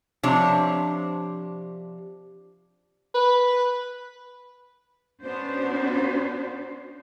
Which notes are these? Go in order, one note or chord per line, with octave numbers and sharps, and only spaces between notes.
C3 F3 D4 C#5
B4
B3 C#4 D4 F#4 C5